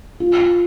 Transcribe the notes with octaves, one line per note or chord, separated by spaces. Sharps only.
F4